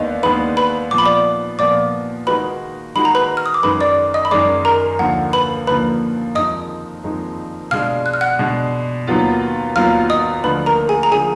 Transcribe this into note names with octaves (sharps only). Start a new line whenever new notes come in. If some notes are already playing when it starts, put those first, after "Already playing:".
Already playing: D#2 D#3 G#3 B3 D4 D#5
D#2 D#3 G#3 B3 D4 B4 B5
B4 B5
A#2 F3 B3 D6
B5
D5 D6
A#2 F3 B3 D5 D6
D#3 G#3 D#4 F#4 B4 B5
D#3 G#3 D#4 F#4 B5
A#5
B4 B5
F6
D#6
D6
F#2 D#3 G#3 B4 B5
D5 D6
D#5 D#6
B5
F#2 D#3 G#3 D5 D6
A#4 A#5
D#2 D3 F3 A#3 F#5
B4 B5
D#2 D3 F3 A#3 B4 B5
F2 D#3 G#3 D#4 D#5 D#6
F2 D#3 G#3 D#4
B2 G#3 D4 F5 F6
F#6
F6
F#5 F#6
B2 G#3 D4
D#2 D#3 F#3 B3 F4
D#2 D#3 F#3 B3 F4 F5 F6
D#5 D#6
D2 D3 F3 B4 B5
A#4 A#5
G#4 G#5
A#5
D3 F3 G#4 G#5